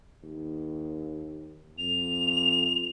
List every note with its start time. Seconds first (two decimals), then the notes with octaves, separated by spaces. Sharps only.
0.23 D#2
1.78 F2 F7